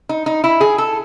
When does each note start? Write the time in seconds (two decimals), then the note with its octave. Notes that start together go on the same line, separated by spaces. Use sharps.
0.09 D#4
0.26 D#4
0.44 E4
0.61 G#4
0.78 A4